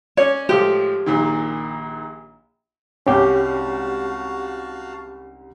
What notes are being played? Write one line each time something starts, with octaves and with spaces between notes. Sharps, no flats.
C#4 C#5 D5
A2 F3 G#3 G4
A#1 A#2 D#3
C2 G#2 C#4 F#4 G4 F5 A5